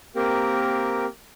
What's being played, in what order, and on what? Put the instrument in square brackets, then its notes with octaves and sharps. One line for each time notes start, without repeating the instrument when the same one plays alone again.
[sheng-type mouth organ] A#3 C4 G4 A#4